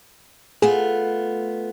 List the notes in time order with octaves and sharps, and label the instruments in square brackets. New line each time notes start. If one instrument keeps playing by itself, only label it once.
[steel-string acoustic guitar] A3 B3 F4 [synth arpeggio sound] G#4